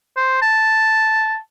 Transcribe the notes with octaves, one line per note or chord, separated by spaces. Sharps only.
C5
A5